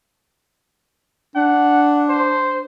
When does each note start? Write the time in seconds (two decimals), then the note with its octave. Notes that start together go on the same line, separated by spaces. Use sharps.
1.36 D4 F#5
2.09 C5